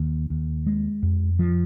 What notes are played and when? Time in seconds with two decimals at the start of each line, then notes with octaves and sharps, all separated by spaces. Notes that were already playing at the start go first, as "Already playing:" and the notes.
Already playing: D#2
0.30 D#2
0.66 G#3
1.02 F2
1.39 F3